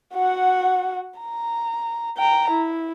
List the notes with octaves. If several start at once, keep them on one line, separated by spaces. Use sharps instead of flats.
F#4 F#5
A#5
G5 A#5
E4